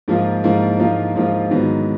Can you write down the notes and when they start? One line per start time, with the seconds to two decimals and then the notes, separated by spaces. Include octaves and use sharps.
0.08 G#2 F3 A#3 F4
0.43 G#2 F3 A#3 F4
0.79 G#2 F3 A#3 F4
1.16 G#2 F3 A#3 F4
1.51 G#2 D#3 F#3 B3